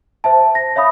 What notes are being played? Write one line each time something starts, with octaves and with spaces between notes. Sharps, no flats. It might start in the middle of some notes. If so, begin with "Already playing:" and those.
C5 E5 A5
A#6
C#5 E5 F5 B5 D#6